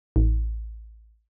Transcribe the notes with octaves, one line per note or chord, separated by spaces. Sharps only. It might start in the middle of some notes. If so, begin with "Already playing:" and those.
A1